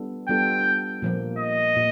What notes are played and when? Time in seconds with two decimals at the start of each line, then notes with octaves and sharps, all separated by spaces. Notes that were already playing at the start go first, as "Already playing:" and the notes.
Already playing: G3 B3 D4 F4 A4
0.29 G3 B3 D4 F4 A4 G5
1.02 A#2 F3 A#3
1.39 D#5
1.76 A#2